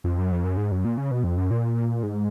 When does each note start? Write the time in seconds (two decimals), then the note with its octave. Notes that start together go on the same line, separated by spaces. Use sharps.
0.04 F2
0.18 F#2
0.32 F2
0.44 F#2
0.57 G#2
0.71 F#2
0.85 A#2
0.97 C#3
1.11 B2
1.24 F2
1.37 F#2
1.51 A#2
2.03 G#2